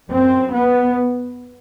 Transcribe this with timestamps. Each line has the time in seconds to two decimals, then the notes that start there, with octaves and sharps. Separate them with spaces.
0.10 F#2 C4
0.53 B3